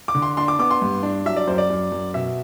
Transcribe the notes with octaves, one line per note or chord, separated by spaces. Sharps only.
D6
D3
C6
D4 C6
D6
B3 D6
C6
G2
D4
F#3 E5
D5
F#2 C5
D5
F#2
F#2
B2 E5